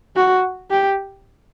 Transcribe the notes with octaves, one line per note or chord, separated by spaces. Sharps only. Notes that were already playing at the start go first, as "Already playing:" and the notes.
F#4
G4